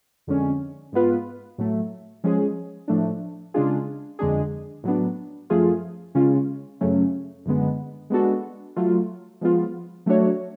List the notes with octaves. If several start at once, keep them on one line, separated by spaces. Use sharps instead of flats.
F2 D3 G#3 C#4
G#2 G#3 B3 F4 B4
A2 F#3 A3
F3 G#3 C#4 G#4
A2 F3 A3 D4
C#3 G#3 D4 F4 G#4
F2 D3 G#3 D4 G#4
A2 F#3 B3 D4
F#2 F3 A3 F4 G#4
C#3 G#3 C#4 F4
F#2 C#3 F#3 A3 C#4
F#2 D3 G#3 B3
G#3 B3 D4 F#4 A4
F#3 A3 F4
F3 G#3 B3 F4
F#3 A3 D4 F#4 C#5